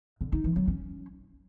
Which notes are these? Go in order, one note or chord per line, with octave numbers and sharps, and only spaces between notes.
D3
D#4
E3
F#3
C#4